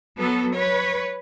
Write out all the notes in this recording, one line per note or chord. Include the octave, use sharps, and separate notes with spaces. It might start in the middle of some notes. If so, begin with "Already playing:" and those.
F#3 B3 A4
B4 C#5